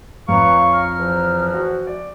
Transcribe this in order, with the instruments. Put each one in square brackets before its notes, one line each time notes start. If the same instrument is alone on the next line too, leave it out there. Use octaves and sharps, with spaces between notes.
[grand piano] F2 [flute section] B4 A#5 [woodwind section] C#5 F5 C#6
[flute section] A#5 F6
[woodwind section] E2 E3 F3
[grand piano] F#4
D5